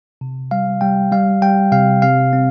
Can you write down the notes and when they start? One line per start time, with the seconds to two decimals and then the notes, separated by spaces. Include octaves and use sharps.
0.21 C3
0.51 G3 F5
0.81 G3 G5
1.12 G3 F5
1.42 G3 G5
1.72 C3 F5
2.02 C3 F5
2.33 C4